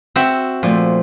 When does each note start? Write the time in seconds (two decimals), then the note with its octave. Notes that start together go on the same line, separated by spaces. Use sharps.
0.16 C4 F#4 E5
0.63 A#2 F3 A3